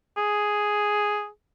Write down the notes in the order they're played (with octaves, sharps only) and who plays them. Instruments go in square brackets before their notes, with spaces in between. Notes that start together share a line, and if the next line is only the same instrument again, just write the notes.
[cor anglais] G#4